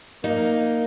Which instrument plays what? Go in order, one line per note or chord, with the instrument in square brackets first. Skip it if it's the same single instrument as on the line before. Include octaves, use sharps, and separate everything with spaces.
[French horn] A#3 [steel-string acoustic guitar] D#4